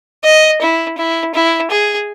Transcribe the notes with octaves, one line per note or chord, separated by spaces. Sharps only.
D#5
E4
E4
E4
G#4